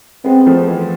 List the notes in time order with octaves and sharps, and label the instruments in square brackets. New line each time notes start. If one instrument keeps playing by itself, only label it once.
[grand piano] G#3 B3 [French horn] C4
[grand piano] F3 A3
E3 G#3